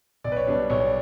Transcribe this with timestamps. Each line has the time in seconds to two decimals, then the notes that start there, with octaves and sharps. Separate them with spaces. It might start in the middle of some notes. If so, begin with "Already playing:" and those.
0.24 B1 D5
0.32 B4
0.36 C#5
0.47 B2 G3 D4 B4
0.70 B1 C#5
0.85 D5